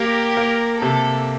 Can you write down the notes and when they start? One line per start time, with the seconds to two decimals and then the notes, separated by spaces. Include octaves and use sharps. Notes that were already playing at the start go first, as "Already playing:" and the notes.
Already playing: A#3 G4 A#4
0.37 A#3
0.82 C3 A4